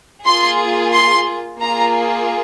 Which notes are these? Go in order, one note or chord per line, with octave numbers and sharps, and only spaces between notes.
A#3 F4 G#4 C6
C6
A#3 F4 G#4 A#5